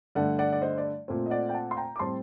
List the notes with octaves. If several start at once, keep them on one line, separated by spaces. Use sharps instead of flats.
G2 D3 A3 D5 F#5
D5 F#5
D5
C5 D#5
D5
A#2 A3 C4
D#5
D5 F#5
G5
F#5 A5
C6
G5 A#5
D6
A2 G3 C4 A5 C6